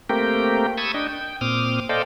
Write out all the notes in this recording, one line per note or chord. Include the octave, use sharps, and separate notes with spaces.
A3 A#3 C4 G4 A#4 G5
A5 B5 C#6 D#6 E6 G#6
D4 D#5 G5
G5
A#2 C4 D6 D#6 F6
A4 C5 D5 D#5 F5 G5